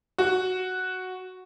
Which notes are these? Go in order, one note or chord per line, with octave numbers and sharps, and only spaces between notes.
F#4